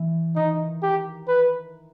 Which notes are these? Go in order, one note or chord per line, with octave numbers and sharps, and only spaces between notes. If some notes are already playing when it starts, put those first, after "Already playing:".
Already playing: E3
D#3 D#4
G4
B4